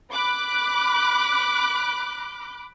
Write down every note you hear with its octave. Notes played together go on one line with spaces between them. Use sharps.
B5 D6 F#6